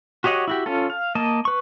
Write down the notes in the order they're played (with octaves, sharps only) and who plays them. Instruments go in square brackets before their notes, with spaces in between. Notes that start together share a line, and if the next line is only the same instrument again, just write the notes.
[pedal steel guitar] F#4 G4 C#5 D#5 F#5
E4 F#4 G4
C#4 F4 A4
F5
A#3 D#5 A5
B4 C#6